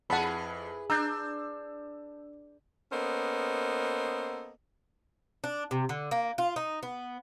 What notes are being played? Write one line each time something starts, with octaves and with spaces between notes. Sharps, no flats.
F2 E4 G#4 B4 F#5 A5 B5
D4 A#5 E6 G6
A#3 B3 C#4 A4 C5 D#5
D4
C3
D3
A#3
F4
D#4
B3